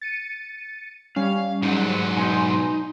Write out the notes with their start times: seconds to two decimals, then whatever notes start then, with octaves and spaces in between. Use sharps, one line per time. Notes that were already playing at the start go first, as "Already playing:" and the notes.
0.01 A6 C#7 D#7
1.16 G3 C#4 F5
1.63 G#2 F#3 G#3 D#4
2.16 B2 D#4 G#5 C6